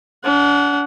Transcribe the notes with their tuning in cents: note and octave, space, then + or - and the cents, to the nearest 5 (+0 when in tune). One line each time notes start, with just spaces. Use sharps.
D4 -40 F#5 +0